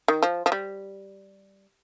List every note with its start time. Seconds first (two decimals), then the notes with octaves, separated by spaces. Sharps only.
0.08 D#3
0.23 F3
0.46 F3
0.52 G3